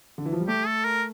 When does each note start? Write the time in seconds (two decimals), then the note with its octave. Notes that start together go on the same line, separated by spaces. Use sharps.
0.18 D3
0.26 E3
0.33 F3
0.40 G3
0.48 A3 G4
0.67 A4
0.85 A#4